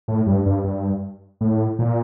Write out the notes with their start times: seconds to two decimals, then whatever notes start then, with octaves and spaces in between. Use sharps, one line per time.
0.08 A2
0.27 G2
0.46 G2
0.64 G2
1.41 A2
1.79 A#2